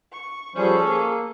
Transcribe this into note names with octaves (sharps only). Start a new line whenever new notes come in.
C#6
F3 G3 C#4 G#4 A4 C5
A#3